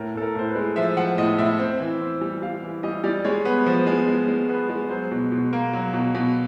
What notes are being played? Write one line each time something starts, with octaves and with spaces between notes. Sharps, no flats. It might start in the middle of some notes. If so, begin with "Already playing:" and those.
Already playing: A2 A#4
A2 A4
A#4
A2 C5
B4
G#3
F3 E5
F3 F#5
A2 D#5
A2 E5
C4
E3
C4
G3
G3 F5
E3
G3 D#5
G3 D5
G#3 C#5
B3
F3
G#3
G#3
G#3
B3
G#3
F#3 C5
B2
B2
A#3
F#3
B2
B2